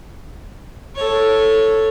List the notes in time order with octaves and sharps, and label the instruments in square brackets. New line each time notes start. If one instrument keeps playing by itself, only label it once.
[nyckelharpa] A4 C#5